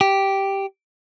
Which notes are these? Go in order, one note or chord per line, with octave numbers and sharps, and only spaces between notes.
G4